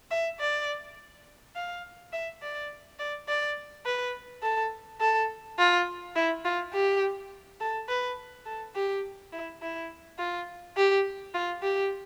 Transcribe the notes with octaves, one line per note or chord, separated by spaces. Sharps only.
E5
D5
F5
E5
D5
D5
D5
B4
A4
A4
F4
E4
F4
G4
A4
B4
A4
G4
E4
E4
F4
G4
F4
G4